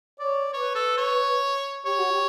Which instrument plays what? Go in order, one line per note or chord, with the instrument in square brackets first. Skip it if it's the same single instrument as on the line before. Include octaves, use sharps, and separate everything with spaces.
[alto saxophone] C#5 [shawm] D5
[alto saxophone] B4 [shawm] C#5
[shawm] A4
C#5
[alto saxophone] G4 [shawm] C#5
[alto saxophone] F#4
G4